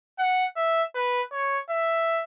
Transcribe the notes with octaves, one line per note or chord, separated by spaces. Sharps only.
F#5
E5
B4
C#5
E5